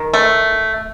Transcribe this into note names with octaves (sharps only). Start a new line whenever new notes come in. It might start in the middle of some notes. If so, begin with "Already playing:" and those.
Already playing: D#3
A3